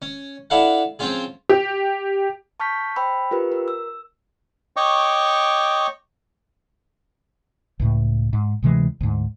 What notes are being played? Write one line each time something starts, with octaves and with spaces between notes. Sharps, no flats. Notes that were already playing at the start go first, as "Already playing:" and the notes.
C#4
D4 E4 A4 F5 F#5
F3 C4 C#4 F4 G#4
G4
A5 C#6 F6 G6 B6
C5 G5 B5 E6
F4 G4 A#4 B4
A#4 E6
E6
C#5 D#5 G5 C#6 D6
C#2 A2
G#2
D2 C3 E3 G#3
D2 G#2